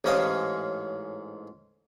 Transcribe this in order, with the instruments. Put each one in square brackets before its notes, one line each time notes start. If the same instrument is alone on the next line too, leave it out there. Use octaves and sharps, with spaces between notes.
[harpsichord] A1 G#2 C#4 F5 D#6